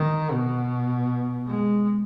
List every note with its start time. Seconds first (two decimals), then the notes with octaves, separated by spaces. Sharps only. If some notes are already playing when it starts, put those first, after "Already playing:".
Already playing: D#3
0.32 B2
1.47 G#3